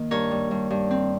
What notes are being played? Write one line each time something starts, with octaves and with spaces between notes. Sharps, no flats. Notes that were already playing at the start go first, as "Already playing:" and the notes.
Already playing: D#3 A#3
G2 A#4 C#5
G3
G2
G2
C4